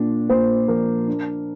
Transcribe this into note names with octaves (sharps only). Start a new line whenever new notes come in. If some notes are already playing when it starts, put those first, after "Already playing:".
Already playing: A#2 D4
A#2 C5
F3 A#4
D4